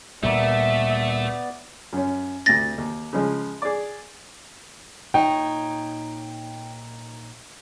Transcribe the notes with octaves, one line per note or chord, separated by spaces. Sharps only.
D2 A#2 G3 A3 B3 D5 E5
F#2 C#4
D2 C3 A6 A#6
D#2
C#3 F3 G#3
G#4 D5
A#2 D#4 C#5 G5